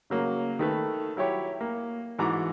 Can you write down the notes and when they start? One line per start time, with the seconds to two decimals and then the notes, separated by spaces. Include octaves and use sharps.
0.10 C#3 F#3 A#3
0.59 D#3 A3 B4
1.17 F#3 E4 G4 C#5
1.61 A#3
2.19 G#2 E3 F#4 A#5 D6